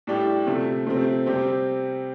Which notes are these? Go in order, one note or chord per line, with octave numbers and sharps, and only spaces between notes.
A2 G3 D4 G4
C3 F3 A3
C3 F3 A3 C4
C3 G3 C4 G4